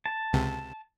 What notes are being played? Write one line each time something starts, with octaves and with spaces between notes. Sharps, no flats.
A5
C#2 C3